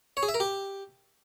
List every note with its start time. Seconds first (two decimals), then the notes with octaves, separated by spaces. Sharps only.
0.17 C#5
0.23 G#4
0.29 E5
0.34 A#4
0.40 G4